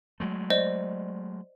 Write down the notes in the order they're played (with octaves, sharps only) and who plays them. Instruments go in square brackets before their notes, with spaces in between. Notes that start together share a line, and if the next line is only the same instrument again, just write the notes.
[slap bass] F#3 G#3 A3
[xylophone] C5 D5 D#5